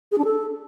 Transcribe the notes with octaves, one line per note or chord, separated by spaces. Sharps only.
G#4
D4
A4